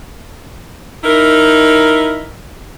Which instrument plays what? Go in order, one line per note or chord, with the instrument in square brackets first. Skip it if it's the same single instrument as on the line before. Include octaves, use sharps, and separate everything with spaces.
[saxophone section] D#4 E4 A#4